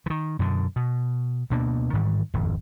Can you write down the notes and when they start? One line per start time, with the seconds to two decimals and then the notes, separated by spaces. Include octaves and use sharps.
0.06 D#3 E3
0.39 F#2 B2 D3
0.76 B2
1.50 D2 B2 A#3 D4
1.93 G#2 D#3 E3 G3
2.34 D#1 G#1 F2